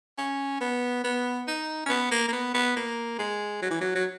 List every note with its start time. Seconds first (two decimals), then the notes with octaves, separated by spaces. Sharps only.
0.18 C#4
0.61 B3
1.04 B3
1.48 D#4
1.86 C#4
1.89 B3
2.11 A#3
2.28 A#3
2.32 B3
2.54 B3
2.77 A#3
3.19 G#3
3.62 F#3
3.71 E3
3.81 F#3
3.95 F#3